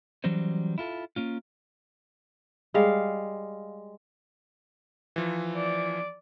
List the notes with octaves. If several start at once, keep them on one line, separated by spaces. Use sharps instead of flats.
E3 F#3 G3 C#4 C5
E4 F4 A4
A#3 C#4 F4
G3 G#3 F5
E3 F3
D5